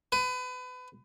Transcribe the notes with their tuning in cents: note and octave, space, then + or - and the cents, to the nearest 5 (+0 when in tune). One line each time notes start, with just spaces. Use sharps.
B4 +30